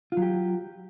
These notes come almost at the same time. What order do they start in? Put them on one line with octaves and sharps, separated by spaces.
F4 F#3 G4